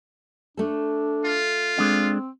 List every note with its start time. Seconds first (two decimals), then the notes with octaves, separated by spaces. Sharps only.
0.57 A3 D4 A4
1.25 F4
1.78 G#3 C4 D4 D5